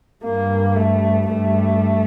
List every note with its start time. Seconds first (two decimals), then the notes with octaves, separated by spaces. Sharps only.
0.24 G2 A#3
0.76 A3
1.28 G2 A3